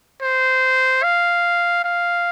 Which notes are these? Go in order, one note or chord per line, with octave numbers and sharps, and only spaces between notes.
C5
F5
F5